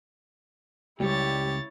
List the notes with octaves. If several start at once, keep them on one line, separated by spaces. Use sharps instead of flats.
C#2 G3 E4 G4 C#5 A6